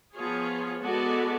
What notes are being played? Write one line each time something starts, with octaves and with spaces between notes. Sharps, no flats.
F3 B3 F4 G#4 C#5
G#3 B3 F#4 A4 D5